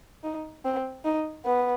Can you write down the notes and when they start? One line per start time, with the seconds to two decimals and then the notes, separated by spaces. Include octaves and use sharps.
0.24 D#4
0.65 C4
1.05 D#4
1.46 B3